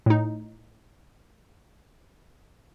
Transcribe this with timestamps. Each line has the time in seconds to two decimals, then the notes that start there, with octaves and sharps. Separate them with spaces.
0.06 A2 D#4